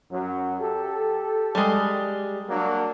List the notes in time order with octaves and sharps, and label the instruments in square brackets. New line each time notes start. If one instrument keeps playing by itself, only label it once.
[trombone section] F#2 F#3
G4 A4
[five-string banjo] G3 G#3
[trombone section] F#3 A#3 D4